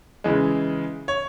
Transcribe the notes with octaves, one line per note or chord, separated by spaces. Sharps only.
C#3 E3 G#3
C#5